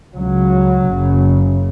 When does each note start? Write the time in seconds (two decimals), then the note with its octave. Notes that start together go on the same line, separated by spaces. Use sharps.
0.15 C#2 C#3 F#3
0.88 F#1 F#2 C#3